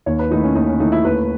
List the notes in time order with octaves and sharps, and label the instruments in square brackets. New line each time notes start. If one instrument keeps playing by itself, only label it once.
[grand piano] D#2 [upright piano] C#5
[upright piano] B4
[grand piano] D#3 A3 E4 [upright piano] D#4
[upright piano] C#4
[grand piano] D#2 [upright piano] D#4
[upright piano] C#4
[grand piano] D#3 A3 E4 [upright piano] D#4
[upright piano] E4
[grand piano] D#2 [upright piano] B4